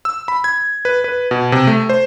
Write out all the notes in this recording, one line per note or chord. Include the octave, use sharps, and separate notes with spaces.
E6
B5
G#6
B4
B4
B2
C3
A3
C5